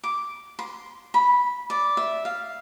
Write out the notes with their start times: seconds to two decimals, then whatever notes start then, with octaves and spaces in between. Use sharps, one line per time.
0.03 D6
0.59 C6
1.14 B5
1.70 D5
1.97 E5
2.25 F5